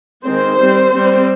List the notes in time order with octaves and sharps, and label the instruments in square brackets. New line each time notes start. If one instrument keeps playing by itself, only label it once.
[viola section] D#3 G#3 C4 C5
G3 C4
G3 C4